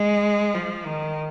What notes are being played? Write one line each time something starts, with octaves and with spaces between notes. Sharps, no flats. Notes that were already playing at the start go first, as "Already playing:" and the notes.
Already playing: G#3
F3
D#3